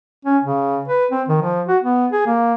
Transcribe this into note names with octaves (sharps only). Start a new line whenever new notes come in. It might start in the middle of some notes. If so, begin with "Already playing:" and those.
C#4
C#3
B4
C4
D#3
F3
F#4
B3
G#4
A#3